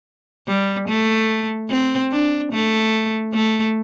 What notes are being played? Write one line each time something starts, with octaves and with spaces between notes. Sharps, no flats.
G3
A3
C4
D4
A3
A3